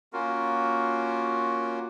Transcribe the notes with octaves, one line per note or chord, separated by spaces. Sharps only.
A#3 C#4 F4 F#4 A#4